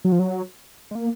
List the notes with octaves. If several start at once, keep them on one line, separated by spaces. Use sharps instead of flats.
F#3
F3
F#3
G#3
A#3